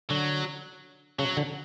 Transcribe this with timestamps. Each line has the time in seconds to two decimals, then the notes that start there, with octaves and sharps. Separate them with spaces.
0.10 D3 F#3
1.19 C#3 F#3
1.37 D3